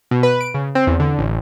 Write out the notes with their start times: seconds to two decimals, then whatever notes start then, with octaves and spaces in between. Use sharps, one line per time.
0.11 B2
0.23 B4
0.41 D7
0.54 C#3
0.75 C4
0.87 E2
1.00 D3
1.19 A1